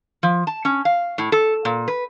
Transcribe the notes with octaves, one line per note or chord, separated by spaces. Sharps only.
F3
A5
C#4
F5
A2
A4
A#2
B4